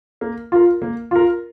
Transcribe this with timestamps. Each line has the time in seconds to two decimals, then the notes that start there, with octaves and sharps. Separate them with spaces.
0.21 A#3
0.52 F4 A#4
0.82 A#3
1.11 F4 A#4